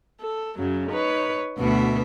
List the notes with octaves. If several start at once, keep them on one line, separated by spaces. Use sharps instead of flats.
A4
F#2 C#3 F#3
D#4 B4 C#5
D2 B2 B3 E5